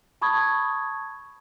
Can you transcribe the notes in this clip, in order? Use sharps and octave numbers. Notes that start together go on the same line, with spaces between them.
A5 B5 C#6 D#6 G#6